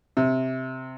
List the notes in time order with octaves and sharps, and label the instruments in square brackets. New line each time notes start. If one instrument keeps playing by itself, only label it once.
[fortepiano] C3